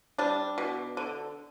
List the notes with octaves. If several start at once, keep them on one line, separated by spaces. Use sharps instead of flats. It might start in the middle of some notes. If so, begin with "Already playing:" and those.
G3 D4
B2
D3